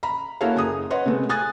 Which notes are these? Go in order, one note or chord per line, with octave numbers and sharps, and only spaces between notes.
A#5 B5
A#3 E4 F#4 A4 C#5 F5
F#1 G#4 D#6
B4 C#5 D#5 F#5 C6
C3 G#3 A3 B3
G#5 D#6 F#6 A6